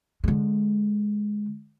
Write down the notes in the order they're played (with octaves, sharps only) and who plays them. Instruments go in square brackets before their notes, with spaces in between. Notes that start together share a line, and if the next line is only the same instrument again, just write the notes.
[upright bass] D3 G#3